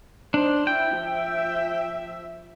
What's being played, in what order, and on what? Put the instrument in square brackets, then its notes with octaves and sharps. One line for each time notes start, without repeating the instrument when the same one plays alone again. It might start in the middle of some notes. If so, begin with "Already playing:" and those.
[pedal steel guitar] D4 [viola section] D#4 C5
[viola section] E4 [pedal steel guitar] G5
[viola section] F3 E5